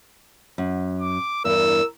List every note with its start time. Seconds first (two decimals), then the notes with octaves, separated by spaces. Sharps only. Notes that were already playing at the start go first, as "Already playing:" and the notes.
0.58 F#2
1.00 D6
1.45 E2 G2 A#4 E6